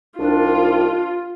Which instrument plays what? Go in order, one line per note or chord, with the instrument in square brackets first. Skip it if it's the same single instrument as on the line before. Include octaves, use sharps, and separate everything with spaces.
[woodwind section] C2 D#3 D4 [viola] F4